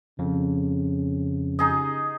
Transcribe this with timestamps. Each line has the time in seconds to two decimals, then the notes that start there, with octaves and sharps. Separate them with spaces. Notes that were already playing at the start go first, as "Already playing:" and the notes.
0.19 F2 C#3
1.59 D#4 G#4 D#5